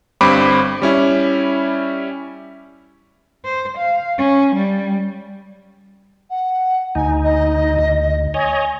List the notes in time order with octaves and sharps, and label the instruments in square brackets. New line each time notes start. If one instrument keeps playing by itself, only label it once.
[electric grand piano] G1 G2 C4 B5 D6 D7
G3 C#4 E4
[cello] C5
F5
C#4
G3
[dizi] F#5
[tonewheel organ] D2 D#4 [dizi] G#5
[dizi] D#5
[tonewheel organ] D2
[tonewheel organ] C#5 D#5 [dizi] G#5